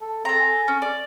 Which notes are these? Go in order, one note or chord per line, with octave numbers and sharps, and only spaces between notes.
A4
C4 A4 A#5
G#5
C#4
D5